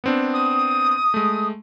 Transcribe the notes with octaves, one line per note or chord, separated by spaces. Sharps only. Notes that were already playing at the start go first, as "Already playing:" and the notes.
B3 C4 D4
D#6
G#3 A3